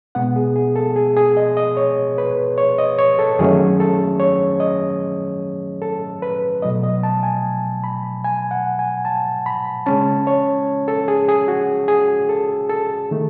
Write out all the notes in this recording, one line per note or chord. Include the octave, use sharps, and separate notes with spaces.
B2 G#3 B3 F#5
G#4
G#4
A4
G#4
G#4
D#5
D#5
C#5
B4
C#5
D#5
C#5
A4
F#2 D#3 F#3 A3 C#4 G#4
A4
C#5
D#5
A4
B4
B2 F#3 A3 D#5
D#5
A5
G#5
B5
G#5
F#5
G#5
A5
B5
C#3 G#3 C#4 A5
C#5
A4
G#4
G#4
F#4
G#4
A4
A4
D#3 A3